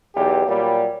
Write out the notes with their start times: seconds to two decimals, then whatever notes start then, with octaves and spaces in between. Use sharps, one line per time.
0.15 B1 E2 G4
0.47 A#2 F#3 G3